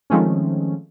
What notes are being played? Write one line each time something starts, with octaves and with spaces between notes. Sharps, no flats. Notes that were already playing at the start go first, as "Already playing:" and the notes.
D#3 F3 G#3 A3 C4 C#4